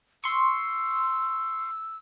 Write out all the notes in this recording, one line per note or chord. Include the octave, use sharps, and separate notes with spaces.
C6 C#6 E6